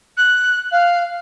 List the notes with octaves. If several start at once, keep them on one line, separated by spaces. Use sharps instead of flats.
F#6
F5